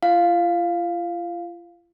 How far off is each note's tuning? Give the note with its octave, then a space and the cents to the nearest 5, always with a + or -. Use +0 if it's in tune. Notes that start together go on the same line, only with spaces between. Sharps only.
F4 -35 F5 +0